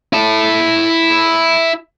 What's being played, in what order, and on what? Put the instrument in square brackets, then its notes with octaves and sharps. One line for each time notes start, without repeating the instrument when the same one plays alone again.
[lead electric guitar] E4 A5